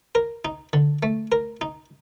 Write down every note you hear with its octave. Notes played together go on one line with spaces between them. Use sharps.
A#4
D#4
D3
A3
A#4
D#4